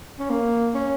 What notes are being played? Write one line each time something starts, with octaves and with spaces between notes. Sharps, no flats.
C#4
A#3
C#4